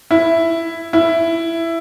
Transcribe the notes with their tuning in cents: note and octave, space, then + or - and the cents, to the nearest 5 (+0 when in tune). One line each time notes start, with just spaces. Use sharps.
E4 +5
E4 +10